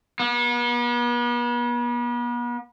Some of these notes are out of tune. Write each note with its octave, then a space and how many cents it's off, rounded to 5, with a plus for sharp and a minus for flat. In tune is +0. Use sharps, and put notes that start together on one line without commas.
B3 -40